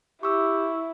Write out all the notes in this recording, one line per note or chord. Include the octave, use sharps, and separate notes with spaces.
E4 G4 C#6 E6